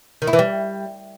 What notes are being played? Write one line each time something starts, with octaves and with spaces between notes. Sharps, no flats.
D#3
E4
E3
G3